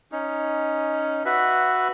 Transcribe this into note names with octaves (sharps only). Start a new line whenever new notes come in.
C#4 D#4
F#4 B4 E5